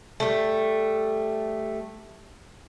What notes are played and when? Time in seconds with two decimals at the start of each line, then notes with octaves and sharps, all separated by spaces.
0.20 G3 A3